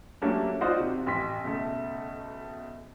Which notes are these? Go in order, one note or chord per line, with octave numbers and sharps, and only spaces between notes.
F#3 G3 A3 A#3 C#4 D4
D#4 F4 F#4 C5 D5 D#5
C3
A1 C6 B6
B1 C#3 A3